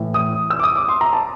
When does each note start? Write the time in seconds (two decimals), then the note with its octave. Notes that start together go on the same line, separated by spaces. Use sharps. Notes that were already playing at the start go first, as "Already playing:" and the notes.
Already playing: A2 E3
0.14 D#6
0.50 E6
0.59 D6
0.63 D#6
0.76 D6
0.89 C6
1.01 A#5
1.13 A5